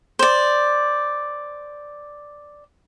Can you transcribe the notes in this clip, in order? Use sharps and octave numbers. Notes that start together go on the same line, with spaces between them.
C5 D5